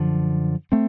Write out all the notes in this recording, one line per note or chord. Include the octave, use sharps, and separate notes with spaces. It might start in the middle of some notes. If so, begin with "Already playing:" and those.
Already playing: F#2 D3 F3
A3 C4